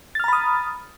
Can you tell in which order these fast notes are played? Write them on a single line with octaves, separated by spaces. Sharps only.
A6 F6 A#5 B5 D#6